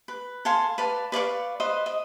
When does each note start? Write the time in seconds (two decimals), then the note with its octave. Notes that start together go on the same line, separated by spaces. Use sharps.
0.08 B4
0.45 A4 F5 G#5 C6
0.78 B4 D5 F5 A5
1.12 B4 D5 F5 C#6
1.60 B4 C5 D#5
1.86 D#5